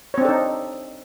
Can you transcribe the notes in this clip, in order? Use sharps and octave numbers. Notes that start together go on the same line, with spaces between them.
C4 D4 D#4 A4 C#5